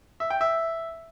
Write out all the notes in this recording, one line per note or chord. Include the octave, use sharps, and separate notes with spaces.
E5
G5
E5